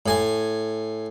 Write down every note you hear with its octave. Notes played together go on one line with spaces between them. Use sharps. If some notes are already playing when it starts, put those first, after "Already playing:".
A2 G#5